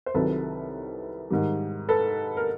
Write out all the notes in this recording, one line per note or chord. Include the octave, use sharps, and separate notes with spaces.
C5
C2 C3 D#3 F#3 A4 B4
G#2 D#3 G3
A4 B4
A#4